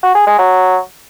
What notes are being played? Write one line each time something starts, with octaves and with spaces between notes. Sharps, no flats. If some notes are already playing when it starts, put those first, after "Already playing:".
F#4
G#4
G#3
F#3